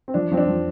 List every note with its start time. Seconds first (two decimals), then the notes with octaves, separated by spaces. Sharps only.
0.08 C4
0.14 F3 D4
0.32 F3 C4
0.37 D4
0.48 F3